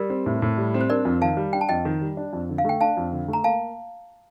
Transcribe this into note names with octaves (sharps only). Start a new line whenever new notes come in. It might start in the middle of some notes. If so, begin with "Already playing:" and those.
Already playing: G3 A#4 D5
C4
A2
A2
G3
C4
C5
D4 A#4 D5
F2
D#3 F5 A5
G3
D4 G5
A5
F2 D#5 G5
D#3
G3
D4
F2
D3
F5
A3 G5
D4 F5 A5
F2
D3
A3 A#5
A#3 F5 A5